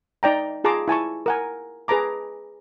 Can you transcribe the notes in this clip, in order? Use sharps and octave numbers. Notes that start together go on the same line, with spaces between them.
D#4 D5 G5 A#5
F4 G#4 A5 A#5 C6 D6
E4 G#5 A5 C#6
A#4 F#5 G#5
G#4 B4 A5 A#5 D6